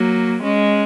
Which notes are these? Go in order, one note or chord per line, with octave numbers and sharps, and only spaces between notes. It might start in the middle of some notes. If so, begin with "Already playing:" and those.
Already playing: F#3 A#3
G#3 C#4